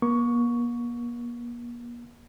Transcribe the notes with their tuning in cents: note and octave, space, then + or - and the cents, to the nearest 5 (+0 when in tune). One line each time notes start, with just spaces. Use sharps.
A#3 +45 C#6 +10